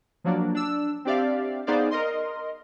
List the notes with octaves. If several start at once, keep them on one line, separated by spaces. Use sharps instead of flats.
F3 F#3 A#3 D4
D4 E6
C4 D4 G4 D5 E5 F5
B3 D#4 G#4 C5 D5 F5
A#4 D#5 C6